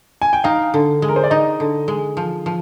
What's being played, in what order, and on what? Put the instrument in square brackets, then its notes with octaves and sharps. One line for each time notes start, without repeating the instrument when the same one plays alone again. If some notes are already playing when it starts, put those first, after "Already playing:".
[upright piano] G#5
G5
[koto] D#4 [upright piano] F5
[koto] D3
G#3
[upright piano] A#4
C5
D5
[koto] D#4 [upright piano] D#5
[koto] D3
G#3
F3
F3